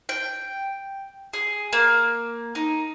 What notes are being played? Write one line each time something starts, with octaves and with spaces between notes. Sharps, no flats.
G5
G#4
A#3
D#4